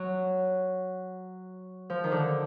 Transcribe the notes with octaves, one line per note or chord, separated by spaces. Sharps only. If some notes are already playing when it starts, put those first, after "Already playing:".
Already playing: F#3
F3
D#3
D3